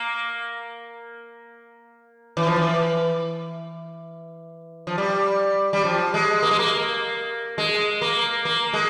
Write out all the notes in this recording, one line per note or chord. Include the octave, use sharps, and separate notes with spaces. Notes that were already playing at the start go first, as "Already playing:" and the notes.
Already playing: A#3
E3
F3
E3
F3
G3
G3
F3
G#3
A#3
G#3
A#3
G#3
A#3
A#3
G#3